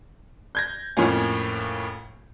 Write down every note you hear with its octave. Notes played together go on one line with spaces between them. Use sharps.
G6 G#6 A#6
F2 A2 F3 A#3 C#4